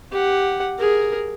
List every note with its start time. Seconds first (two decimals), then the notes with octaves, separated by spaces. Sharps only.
0.12 G4 F#5
0.79 G#4 A#4